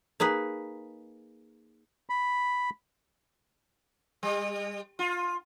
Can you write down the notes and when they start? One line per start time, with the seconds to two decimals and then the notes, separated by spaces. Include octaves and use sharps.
0.20 A#3 D#4 G#4 B4
2.09 B5
4.23 G3
4.99 F4